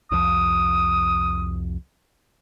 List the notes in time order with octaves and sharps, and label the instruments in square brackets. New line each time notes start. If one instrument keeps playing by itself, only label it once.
[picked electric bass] C2 F2 F3 [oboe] D#6